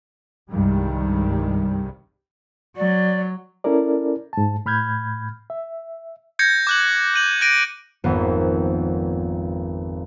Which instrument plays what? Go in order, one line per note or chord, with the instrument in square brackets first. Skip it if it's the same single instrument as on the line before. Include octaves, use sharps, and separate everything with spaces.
[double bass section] C2 G2 C3 D#3 G3 G#3
[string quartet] F#3 [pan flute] D5
[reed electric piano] C#4 E4 A4 A#4 D5
G#2 A5
A2 B5 F6 G6 G#6
E5
[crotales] G6 G#6 A#6 C#7
D6 F#6 F#7
G6 D#7 F#7
F#6 G6 A#6 D7 D#7
[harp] G#1 F2 A#3 B3